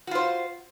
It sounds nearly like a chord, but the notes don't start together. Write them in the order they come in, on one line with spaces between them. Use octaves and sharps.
F#4 F4 C5